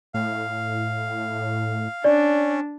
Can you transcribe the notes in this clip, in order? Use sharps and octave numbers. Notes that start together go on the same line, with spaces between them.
A2 F5
C#4 D4 D5